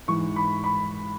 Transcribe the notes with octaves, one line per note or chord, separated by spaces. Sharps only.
G#2 E3 C#6
B5
B5